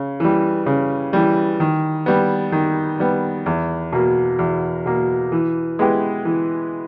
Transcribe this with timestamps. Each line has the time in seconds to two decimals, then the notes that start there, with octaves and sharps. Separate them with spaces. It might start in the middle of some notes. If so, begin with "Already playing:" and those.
Already playing: C#3
0.20 E3 G3
0.66 C#3
1.13 E3 G3
1.60 D#3
2.06 G3 B3
2.52 D#3
3.00 G3 B3
3.46 E2
3.93 B2 A#3
4.39 E2
4.86 B2 A#3
5.32 E3
5.79 G#3 B3 E4 G4
6.25 E3